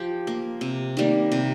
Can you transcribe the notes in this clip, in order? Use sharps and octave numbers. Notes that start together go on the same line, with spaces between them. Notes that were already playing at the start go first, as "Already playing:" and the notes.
Already playing: F3 G4
A#3
C3
D#3 G3 A#3
C3